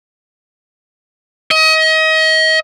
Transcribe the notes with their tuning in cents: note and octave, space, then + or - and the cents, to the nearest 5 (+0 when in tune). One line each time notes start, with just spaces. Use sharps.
D#5 +30